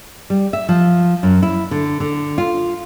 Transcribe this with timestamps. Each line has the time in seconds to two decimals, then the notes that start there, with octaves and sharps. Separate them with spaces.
0.30 G3
0.53 E5
0.69 F3
1.23 F#2
1.43 E4
1.71 D3
2.00 D3
2.38 F4